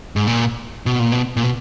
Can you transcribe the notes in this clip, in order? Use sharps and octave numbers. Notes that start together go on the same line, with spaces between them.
G#2
A#2
B2
A#2
B2
A#2
B2